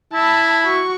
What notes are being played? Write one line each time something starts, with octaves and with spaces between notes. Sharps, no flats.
E4 A5 B5
F#4 C#6